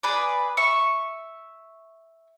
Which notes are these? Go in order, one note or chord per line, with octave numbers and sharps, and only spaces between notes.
G#4 B4 D5
E5 C#6